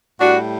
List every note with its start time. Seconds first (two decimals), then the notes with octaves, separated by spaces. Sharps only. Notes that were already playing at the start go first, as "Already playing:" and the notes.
0.20 A2 G3 D4 F#4